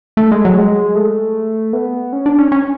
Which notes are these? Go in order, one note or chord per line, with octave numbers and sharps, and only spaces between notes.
A3
G#3
F#3
G#3
A3
B3
C#4
D4
C#4
C#4